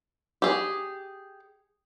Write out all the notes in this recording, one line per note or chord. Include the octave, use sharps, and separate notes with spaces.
G4 G#4